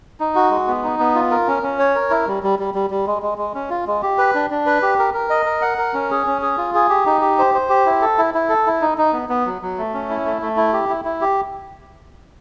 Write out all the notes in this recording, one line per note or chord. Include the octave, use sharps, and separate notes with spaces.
D#4
F#4
G#3
B3
D#4
B3
F4
A#4
C#4
C#4
C#5
A#4
E4
G3
G3
G3
G3
G3
G#3
G#3
G#3
C#4
F4
G#3
G4
B4
D4
D4
B4
G4
A#4
A#4
D#5
A#4
F#5
A#4
C#4
G#4
C#4
G#4
F4
G#4
G4
D#4
G4
C5
C5
G4
E4
A4
E4
E4
A4
E4
D#4
D#4
B3
B3
F#3
F#3
A3
C#4
E4
A3
A3
E4
G4
E4
E4
G4